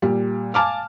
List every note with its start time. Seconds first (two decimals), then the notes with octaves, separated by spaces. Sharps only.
0.02 A#2 G3
0.54 F5 G#5 A5 D6 F6